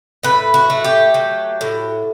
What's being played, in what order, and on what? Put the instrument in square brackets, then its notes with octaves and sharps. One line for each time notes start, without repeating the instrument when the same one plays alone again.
[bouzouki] A2 B4
F#4
A3
G4
F#3
A2